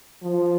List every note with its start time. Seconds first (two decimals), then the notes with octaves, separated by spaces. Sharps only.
0.23 F3